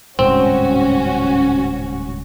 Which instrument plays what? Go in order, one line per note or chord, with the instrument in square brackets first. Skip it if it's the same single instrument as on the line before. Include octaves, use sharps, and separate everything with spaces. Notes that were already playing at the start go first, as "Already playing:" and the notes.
[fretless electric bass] D1 C2 G#2 [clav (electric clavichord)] C4 [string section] C#4 F#4